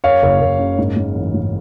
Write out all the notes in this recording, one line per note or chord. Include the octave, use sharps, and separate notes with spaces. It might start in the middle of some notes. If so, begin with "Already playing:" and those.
F#2 C#5 F5
F#1
F#1
C#3
G#2
G#2
A1
G#2